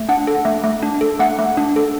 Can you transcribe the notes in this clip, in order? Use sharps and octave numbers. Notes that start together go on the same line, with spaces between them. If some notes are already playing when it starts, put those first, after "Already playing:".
Already playing: A3
D4 F#5
A4
A3
A3
D4
A4
A3 F#5
A3
D4
A4